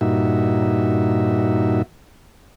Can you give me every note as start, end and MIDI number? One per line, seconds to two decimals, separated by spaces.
0.01 1.82 43
0.01 1.82 46
0.01 1.82 63
0.01 1.82 66
0.01 1.82 76